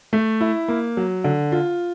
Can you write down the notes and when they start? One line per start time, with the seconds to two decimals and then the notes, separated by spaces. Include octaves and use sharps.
0.13 A3
0.41 E4
0.68 A#3
0.97 F#3
1.24 D3
1.52 F4